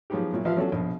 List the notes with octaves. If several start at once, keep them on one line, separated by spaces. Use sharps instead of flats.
F3 F#3 G#3 B3 D#4 G4
A#2 F#3 E4
A1 F3 F4 B4 E5 F5
F#3 C#4 D4 F#4 A4
A#1 B2